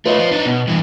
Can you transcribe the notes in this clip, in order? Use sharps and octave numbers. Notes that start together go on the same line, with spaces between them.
A3 F4 B4 C#5 D#5
F3 F4
D4 D#4
B2
G2 E3